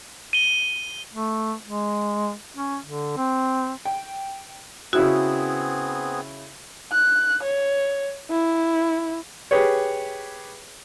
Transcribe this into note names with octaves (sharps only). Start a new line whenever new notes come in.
D#7 G7
A3
G#3
C#4
D3
C4
G5
C#3 B3 C4 E4 F#4 G#4 E6
F#6
C#5
E4
G4 G#4 B4 C#5